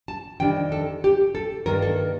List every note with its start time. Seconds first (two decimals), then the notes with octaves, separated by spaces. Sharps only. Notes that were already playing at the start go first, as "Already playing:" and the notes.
0.08 A5
0.40 F2 D#3 G3 D4 G5
0.72 A4
1.04 G4
1.35 A4
1.66 G2 D#3 A#3 D4 A#4
1.82 A4